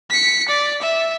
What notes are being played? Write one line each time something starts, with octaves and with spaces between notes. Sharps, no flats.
B6 C#7
D5
E5